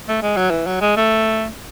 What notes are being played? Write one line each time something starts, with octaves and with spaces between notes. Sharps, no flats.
A3
G#3
F#3
E3
F#3
G#3
A3